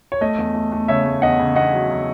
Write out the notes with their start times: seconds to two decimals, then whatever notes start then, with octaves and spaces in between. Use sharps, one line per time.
0.12 C#5
0.21 A3 D#5
0.38 E2
0.55 A3
0.72 A3
0.88 C#3 C#5 E5
1.06 A3
1.22 E2 D#5 F#5
1.39 C#3
1.56 E2 D#5 F#5
1.73 F#3
1.90 F#3